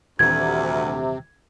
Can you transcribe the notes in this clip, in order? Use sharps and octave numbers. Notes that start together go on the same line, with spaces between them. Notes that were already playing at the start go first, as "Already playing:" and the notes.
D#1 D2 C3 E3 G#6